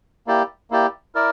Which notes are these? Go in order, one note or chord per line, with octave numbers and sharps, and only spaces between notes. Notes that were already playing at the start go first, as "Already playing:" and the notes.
A#3 E4 G4 D5
A#3 E4 G4 D5
E4 A#4 D5